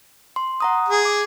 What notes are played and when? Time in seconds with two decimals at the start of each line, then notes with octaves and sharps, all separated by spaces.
0.36 C6
0.60 F#5 A#5 D#6
0.89 G#4
1.05 D6